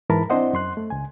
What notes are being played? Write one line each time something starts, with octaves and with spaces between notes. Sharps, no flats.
G#2 E3 A#4 A5 B5
C4 D4 E4 C5 D#5 F#5
F#2 C6 F#6
A3
C#2 G#5